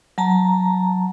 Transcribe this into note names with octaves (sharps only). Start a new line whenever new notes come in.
F#3 A5 A#5